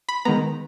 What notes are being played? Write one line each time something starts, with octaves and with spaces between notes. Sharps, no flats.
B5
D#3 G#3 B3 A#5